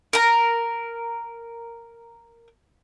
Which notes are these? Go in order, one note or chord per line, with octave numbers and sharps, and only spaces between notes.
A#4 A#5